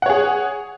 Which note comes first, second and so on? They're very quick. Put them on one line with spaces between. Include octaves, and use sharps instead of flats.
F#5 C#5 G#4